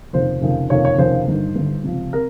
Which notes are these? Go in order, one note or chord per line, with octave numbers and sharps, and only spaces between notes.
F1 D#2 C#3 F3 C5
F1 D#2 C#3 F3
F1 D#2 C#3 F3 C#5
C#5
F1 D#2 C#3 F3 C5
G1 G2 D#3
G1 G2 D#3
C#2 C3 F3
C3 A#4